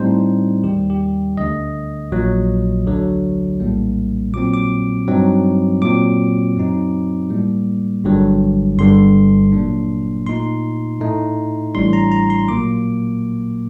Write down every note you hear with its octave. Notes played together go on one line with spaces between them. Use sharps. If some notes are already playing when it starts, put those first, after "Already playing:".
Already playing: A2 G3 C4 D#4 C5
D#2 D#3 G3 G4
G4
D2 D3 A3 D#5
A#1 A#2 F#3
D2 D3 F#3
A#1 A2 G3 A#3
A#2 F#3 C4 D6
D6
G2 F#3 C4 D#4
A#2 F#3 C4 D6
F#2 F#3 C4 D#4
A2 G3 A#3
G1 G2 D3 F#3
G1 G2 D3 G3 C6
A#2 F#3 A#3 D4
A#2 A3 D#4 C6
A2 A3 D#4
A1 A2 G3 D4 C6
A#5
A#5
C6
A#2 F#3 A#3 D6